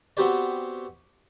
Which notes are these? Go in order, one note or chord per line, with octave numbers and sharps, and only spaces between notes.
B3 C4 F#4 G4 B4 D5